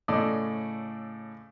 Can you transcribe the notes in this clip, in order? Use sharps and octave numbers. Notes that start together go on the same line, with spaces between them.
A2 C#3 A4 D5 D#5